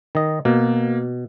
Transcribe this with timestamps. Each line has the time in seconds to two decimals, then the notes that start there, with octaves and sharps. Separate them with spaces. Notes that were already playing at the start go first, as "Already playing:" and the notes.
0.15 D#3 D#5
0.45 B2 A#3